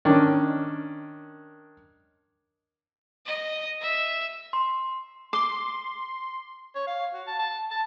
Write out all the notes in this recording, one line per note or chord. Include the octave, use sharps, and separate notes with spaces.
D#3 C#4 D4
D#5
E5
C6
C6 D6
C#5
F5
F#4
A5
A5
A5